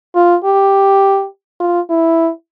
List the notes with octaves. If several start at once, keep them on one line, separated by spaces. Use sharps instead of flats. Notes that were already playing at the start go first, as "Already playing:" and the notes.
F4
G4
F4
E4